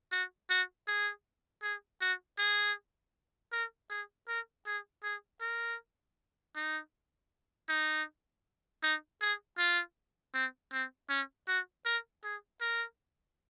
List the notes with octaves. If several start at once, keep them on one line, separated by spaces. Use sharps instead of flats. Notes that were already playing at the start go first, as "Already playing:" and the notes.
F#4
F#4
G#4
G#4
F#4
G#4
A#4
G#4
A#4
G#4
G#4
A#4
D#4
D#4
D#4
G#4
F4
C4
C4
C#4
F#4
A#4
G#4
A#4